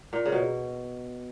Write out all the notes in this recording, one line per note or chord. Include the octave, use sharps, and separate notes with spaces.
A#2
C#3
B2